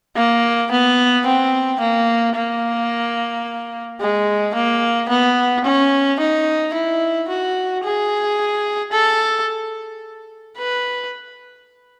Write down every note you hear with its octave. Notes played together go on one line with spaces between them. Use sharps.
A#3
B3
C4
A#3
A#3
G#3
A#3
B3
C#4
D#4
E4
F#4
G#4
A4
B4